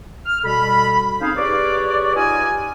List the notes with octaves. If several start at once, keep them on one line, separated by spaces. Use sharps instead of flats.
F6
B2 G3 A4 B5
C4 C#4 D#4 G#4 C5 F5
G4 G#4 B4 C#5 D5
D#4 F4 G4 D#5 F5 G#5